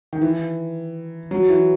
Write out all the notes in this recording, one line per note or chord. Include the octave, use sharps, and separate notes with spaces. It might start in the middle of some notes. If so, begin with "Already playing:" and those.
D#3
E3
F#3
E3